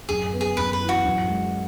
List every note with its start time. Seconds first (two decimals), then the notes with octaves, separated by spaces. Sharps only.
0.09 F#2 G#4
0.33 B3
0.41 G#4
0.56 F#2 B4
0.73 B4
0.81 E3
0.89 F#4
1.05 F#2
1.28 G#3